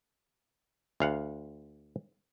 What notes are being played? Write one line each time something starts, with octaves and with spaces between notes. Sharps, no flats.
D2 F5 F#5